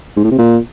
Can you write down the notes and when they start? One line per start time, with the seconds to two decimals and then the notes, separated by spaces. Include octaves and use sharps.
0.17 G#2
0.24 A2
0.31 C3
0.38 A#2